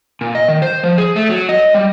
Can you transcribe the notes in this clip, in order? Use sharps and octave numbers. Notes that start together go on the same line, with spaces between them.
A#2
D#5
D#3
C5
F3
G#4
A3
F#3
D#5
G3